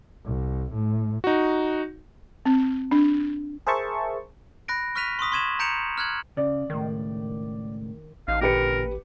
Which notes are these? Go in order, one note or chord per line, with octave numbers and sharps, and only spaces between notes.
C2
A2
D#4 F#4
C4
D4
G#4 A#4 C5 E5 A5 C#6
B5 F#6 A#6 D7
C#6 F6 F#6 B6 D#7 F7
C6 C#6 D#6 B6
C6 C#6 G#6 D#7 E7 F#7
A#5 G6 C#7 D7 E7 F7
F6 F#6 G#6 F#7
C#3 D5
C#2 A2 D#3
A1 D#4 F5
A#2 D3 G4 A#4 B4 C#7